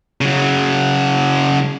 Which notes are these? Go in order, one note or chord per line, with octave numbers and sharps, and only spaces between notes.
C#3 F#3